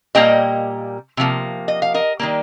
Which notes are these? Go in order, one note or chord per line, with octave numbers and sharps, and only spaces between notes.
A#2 G3 A#3 D#5 G5
C3 F3 A#3
D#5
F5
A#4 D#5
D#3 G3 A#3